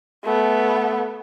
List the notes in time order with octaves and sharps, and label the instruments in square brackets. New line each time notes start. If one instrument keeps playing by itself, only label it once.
[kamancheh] A3 B3